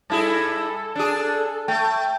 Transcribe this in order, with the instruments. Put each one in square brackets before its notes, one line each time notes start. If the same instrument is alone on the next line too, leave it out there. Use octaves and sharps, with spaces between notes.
[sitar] G2 E4 G#4 [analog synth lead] A4
[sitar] D4 G#4
[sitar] A3 [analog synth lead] G5